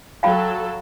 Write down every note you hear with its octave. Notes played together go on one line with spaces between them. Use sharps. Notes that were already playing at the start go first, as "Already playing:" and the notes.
F#3 A4 F5 G5 B5